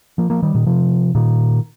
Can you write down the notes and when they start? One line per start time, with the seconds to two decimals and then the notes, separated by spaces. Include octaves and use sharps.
0.18 F3 A#3
0.30 F3 A#3
0.43 D#3 G3
0.54 A#2 D#3
0.67 C3 F3
1.15 A#2 D#3